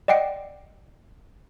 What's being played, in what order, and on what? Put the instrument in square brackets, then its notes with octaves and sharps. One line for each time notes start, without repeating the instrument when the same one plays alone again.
[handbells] D5 D#5 F#5 G5 C7 D7